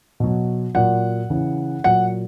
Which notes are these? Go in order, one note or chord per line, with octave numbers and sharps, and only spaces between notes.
B2 F#3
A#2 F#3 F#5
C#3 E3
A#2 F#3 F#5